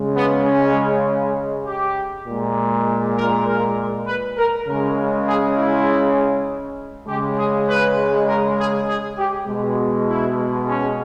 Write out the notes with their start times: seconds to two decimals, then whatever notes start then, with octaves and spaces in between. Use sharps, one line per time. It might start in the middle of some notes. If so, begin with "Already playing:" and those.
Already playing: C#3 G#3
0.16 B3
0.46 C#4
1.67 G4
2.27 A#2 G#3
3.17 A#4
3.47 A#4
4.07 B4
4.37 A#4
4.67 C#3 G#3 A#4
5.27 G#4
5.57 E4
7.08 C#3 G#3 G4
7.38 G#4
7.68 B4
8.28 A#4
8.58 G#4
8.88 G#4
9.18 G4
9.48 B2 G#3
10.08 E4
10.68 C#4